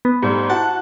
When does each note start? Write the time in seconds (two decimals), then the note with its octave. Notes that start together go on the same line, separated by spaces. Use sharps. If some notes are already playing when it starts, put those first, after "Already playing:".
0.05 B3
0.23 G#2 G3 A3
0.50 E4 F#4 F#5 A5